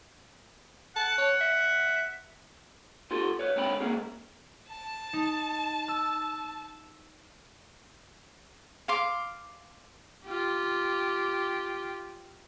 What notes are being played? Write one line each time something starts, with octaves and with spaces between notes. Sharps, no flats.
F#5 A5
C#5
E5
F4 G4 A4 C6
B4 C#5
C#2 D3 C4 C#5 G5 B5
C#2 A#3 C#4 G#4
A5
D#4
E6
F5 C6 D6
F4 G4